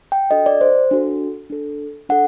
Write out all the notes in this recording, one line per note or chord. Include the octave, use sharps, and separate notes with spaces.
G5
D4 F#4 A4 D#5
D5
C5
D4 F#4 A4
D4 A4
D4 A4 F#5